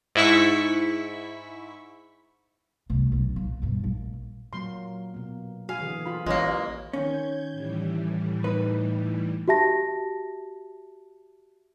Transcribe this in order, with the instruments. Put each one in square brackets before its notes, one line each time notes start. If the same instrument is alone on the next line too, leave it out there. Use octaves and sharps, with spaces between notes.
[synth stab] G#2 E4 C#6 B6
[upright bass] C2 A3
B1 F#2
A#2
B1 G2
A#1
[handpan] A#2 F#3 A#3 [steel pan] C6
[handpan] B2 A#3
[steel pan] F#4 G#5 [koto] F5
[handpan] D3 E3 G#4
[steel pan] F4 B5
[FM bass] A1 [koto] G#3 A#3 [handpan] E4 [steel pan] F4 C#5
[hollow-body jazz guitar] D#3 C#4 [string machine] G6 G#6
[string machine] A2 E3 G3
[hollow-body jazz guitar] D#4 B4
[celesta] F#4 G4 E5 A5 A#6